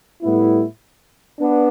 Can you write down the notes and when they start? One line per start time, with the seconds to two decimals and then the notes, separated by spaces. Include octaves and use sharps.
0.22 A2 G3 B3 E4
1.39 B3 D4